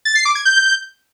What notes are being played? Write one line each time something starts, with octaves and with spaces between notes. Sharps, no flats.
A6
C7
D6
G#6
G6